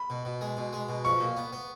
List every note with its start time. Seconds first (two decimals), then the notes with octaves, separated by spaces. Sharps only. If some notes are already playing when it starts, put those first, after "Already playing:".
Already playing: B5
0.10 B2
0.25 B2
0.41 G#3
0.57 B2
0.73 G#3
0.89 B2
1.05 F3 C#6
1.21 A#2
1.37 B3
1.53 B3